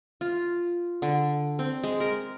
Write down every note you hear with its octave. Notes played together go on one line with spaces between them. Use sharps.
F4
D3
C4
G#3
A#4